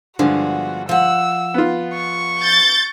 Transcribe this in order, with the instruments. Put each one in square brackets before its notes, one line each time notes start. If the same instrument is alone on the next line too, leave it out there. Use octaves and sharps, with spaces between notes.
[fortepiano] G2 D3 G#3 [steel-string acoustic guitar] F3 B3 [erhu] F#4
[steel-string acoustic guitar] F3 F#5 [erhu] E6
[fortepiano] B3 F4
[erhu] C#6
[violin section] G6 A6